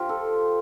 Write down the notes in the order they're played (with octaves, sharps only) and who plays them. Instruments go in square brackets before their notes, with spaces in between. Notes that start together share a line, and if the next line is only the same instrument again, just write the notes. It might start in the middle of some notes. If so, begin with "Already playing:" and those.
Already playing: [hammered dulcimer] F3 F4 G4
A4